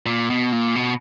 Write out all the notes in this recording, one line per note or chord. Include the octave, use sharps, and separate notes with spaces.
A#2
B2
A#2
B2